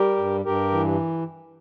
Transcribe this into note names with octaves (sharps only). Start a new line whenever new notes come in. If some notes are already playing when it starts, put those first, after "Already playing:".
Already playing: G3 G4 A#4
G2
G2 G4 A#4
E3